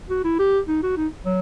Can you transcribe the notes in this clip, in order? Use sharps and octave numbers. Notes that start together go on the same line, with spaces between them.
F#4
E4
G4
D#4
F#4
D#4
F#3